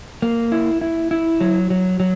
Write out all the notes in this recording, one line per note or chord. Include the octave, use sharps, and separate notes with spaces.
A#3
E4
E4
E4
F#3
F#3
F#3